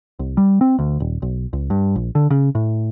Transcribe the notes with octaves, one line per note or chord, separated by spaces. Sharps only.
C2
G3
C4
D2
D#1
B1
C#2
G2
A#1
D3
C#3
A2